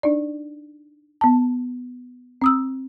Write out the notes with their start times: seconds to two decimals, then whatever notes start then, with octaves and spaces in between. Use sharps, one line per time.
0.03 D4 D#4 D5
1.21 B3 A5
2.42 C4 D#6 E6